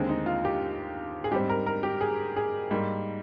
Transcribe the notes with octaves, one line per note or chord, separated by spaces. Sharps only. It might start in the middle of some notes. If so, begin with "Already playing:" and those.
Already playing: D#2 D3 G#3 C4
D#4
F4
G4
G#4
G#2 G3 C4 G4
A#4
A#4
G4
G#4
G#4
G#2 G3 A#3